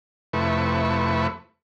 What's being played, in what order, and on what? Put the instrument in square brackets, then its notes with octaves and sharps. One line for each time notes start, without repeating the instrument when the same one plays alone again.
[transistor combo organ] F2 C3 A3 E4 B4 C#6